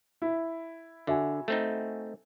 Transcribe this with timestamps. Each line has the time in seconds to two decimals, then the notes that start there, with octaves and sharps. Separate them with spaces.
0.22 E4
1.07 D3 F#4 E5 G#5
1.48 A3 C4 D#4